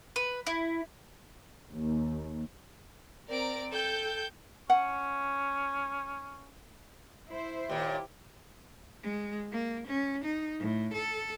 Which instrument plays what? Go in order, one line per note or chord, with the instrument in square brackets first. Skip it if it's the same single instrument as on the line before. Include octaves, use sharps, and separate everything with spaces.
[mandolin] B4
E4
[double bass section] D#2
[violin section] C4 A#4 D5 A#5 D7
A4 G5 G6
[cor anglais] C#4 [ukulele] F#5
[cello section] E4 C5
[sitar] D#2 A#2 [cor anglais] G4
[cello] G#3
A#3
C#4
D#4
A2
A4